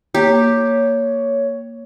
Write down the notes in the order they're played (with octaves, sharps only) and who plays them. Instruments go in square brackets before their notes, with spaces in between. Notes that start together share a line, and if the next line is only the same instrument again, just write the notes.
[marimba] A#3 [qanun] G4 [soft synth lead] C#5